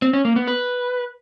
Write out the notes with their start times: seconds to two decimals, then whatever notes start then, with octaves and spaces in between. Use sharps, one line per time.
0.02 C4
0.13 C#4
0.25 A#3
0.36 B3
0.47 B4